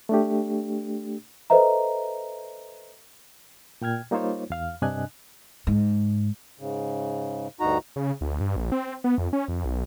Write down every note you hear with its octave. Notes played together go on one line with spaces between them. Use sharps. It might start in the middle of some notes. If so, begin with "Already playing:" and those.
A3 D4 G4
A4 B4 C5 D#5 E5 A#5
A#2 G5 F6 G#6
G3 A#3 D#4 F4 C5 C#5
E2 F5 F6
G2 C3 D4 D#5 G#5 F#6
G#2
G#2 C#3
D2 G2 D#4 F#4 A#5
C#3
D2
G2
A#1
C4
B3
F2
C#4
F2
B1